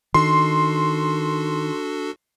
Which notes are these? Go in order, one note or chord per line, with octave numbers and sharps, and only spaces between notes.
D#3 D4 F#4 A4 C6